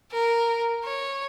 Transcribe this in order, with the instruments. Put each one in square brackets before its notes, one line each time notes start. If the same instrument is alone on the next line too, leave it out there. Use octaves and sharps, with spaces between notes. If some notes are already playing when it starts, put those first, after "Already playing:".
[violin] A#4
C#5